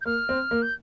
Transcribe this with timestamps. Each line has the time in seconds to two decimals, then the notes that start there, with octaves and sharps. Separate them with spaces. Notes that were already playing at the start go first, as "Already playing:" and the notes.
0.01 G6
0.06 A#3 F6
0.29 C4
0.51 A#3
0.62 G6